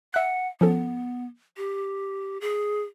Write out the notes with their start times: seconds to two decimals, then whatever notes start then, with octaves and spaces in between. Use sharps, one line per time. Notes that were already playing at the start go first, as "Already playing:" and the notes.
0.14 E5 F#5 F#6
0.61 F3 B3 C#4 A4
1.57 G4
2.41 G#4